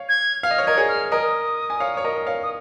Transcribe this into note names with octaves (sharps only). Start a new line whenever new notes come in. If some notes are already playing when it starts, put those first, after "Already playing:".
Already playing: C#5 F5
G#6
F5 F6
D#5
C#5
A#4 D#5 G#6
G#4 C#5
F6
A#4 D#5 D#6
G#5
C#5 F5
C#5
A#4 D#5
C#5 F5
D#6